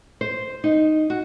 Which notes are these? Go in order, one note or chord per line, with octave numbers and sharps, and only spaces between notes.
C5
D#4
F#4